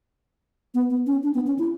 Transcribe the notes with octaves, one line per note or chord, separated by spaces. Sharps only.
B3
B3
C#4
D4
B3
C#4
E4